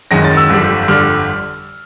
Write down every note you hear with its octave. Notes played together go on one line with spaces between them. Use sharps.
F#1 F#2 D#3 G#3 A#6
A6
E6
G1 F2 D3 G3
G1 F2 D3 G3 F6